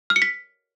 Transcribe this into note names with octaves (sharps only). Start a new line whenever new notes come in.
F6
C#7
B6